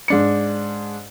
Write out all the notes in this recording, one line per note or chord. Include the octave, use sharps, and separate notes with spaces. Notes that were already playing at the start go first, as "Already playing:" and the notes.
G#2 D4 C#7